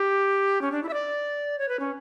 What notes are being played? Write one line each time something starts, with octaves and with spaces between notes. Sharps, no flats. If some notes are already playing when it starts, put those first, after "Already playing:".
Already playing: G4
C#4
D4
E4
E5
D5
C#5
B4
C#4